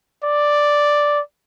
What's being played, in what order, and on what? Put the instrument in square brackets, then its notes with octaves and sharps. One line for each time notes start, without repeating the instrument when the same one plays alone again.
[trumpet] D5